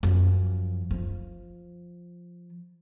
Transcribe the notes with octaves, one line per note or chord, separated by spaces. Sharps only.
F#2 F3
F3